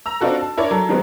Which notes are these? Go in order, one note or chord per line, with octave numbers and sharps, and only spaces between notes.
A#5 E6
C4 D4 D#4 F4 F#4 A4
A5
D4 E4 A#4 C#5 D5
F#3 A4
D#3 F#3 G#3 B3 C4